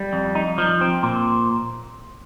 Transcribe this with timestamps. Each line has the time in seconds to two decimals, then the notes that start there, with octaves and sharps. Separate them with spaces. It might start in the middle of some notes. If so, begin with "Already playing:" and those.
Already playing: G3
0.13 F2
0.35 D#4
0.58 F3
0.81 C4
1.03 A#2